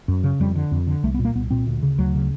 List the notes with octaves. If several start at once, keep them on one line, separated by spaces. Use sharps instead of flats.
F#2
C#3
F2 G3
D3
F2
D3
C2 A3
B3
A#2
A#3
C2 B3
A#2 C4
D2
C#3
D2 F#3
C#3